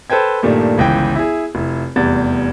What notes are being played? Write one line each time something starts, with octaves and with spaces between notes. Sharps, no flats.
A4 B4 C5 G5 G#6
G2 A#2 D#3 G3 A3
G1 C#2 E3 G5
E4 G#4
F1 E4
F1 E2 G3 A6